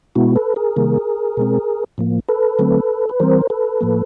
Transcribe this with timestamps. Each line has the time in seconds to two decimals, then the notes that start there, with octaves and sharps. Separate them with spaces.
0.15 B2 G#3 B3 E4 F#4
0.36 A4 B4
0.56 G#4 A#4
0.76 C3 D#3 G3 A#3
1.37 B2 G#3 C4
1.98 A2 F3 A#3
2.29 A4 B4
2.59 D3 F#3 A3 C4
3.09 B4
3.20 E3 G3 C4 A#4 C5
3.50 A4 B4
3.81 A2 F3 A#3